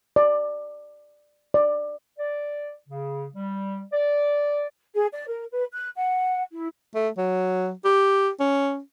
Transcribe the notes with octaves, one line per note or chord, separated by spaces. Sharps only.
D5
D5
D5
C#3
G3
D5
G#4
D5
A#4
B4
F#6
F#5
E4
A3
F#3
G4
C#4